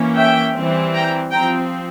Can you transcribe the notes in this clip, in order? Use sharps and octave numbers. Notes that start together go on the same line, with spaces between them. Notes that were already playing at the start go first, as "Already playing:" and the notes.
Already playing: E3 A#3 C#4
E5 G5
E3 G3 C4
G5 A#5
F3 C4 G5 A#5